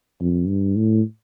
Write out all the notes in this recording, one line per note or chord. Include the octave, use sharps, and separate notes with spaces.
F2
G2
A2